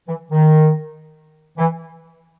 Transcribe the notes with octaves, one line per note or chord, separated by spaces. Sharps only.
E3
D#3
E3